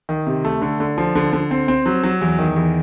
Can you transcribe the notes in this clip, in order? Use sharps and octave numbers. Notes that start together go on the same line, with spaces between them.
D#3
C3
A3
D3
D3
F3
D3
D3
C4
C4
F#3
F#3
E2
D#3
E2